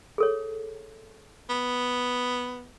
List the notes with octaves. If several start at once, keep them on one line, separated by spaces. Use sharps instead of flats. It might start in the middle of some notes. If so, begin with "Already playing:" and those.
G#4 A4 C#5
B3